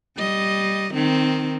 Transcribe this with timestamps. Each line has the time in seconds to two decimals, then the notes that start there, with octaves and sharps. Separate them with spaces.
0.17 G3 D#5
0.94 D#3 C4